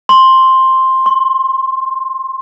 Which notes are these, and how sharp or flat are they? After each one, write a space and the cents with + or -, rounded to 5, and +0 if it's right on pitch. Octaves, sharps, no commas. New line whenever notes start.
C6 +5
C6 +40